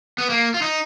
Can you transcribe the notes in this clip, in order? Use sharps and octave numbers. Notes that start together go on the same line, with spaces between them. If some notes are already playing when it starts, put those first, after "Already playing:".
B3
A#3
F4
D#4